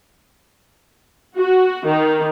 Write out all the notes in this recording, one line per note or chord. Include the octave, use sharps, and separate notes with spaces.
F#4
D#3